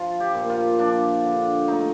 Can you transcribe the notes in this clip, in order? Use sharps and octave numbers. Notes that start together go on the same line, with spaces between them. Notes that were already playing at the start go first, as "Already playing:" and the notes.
Already playing: F3 F4
G4
A#2
F4
F3 D4
D3
A3 D#4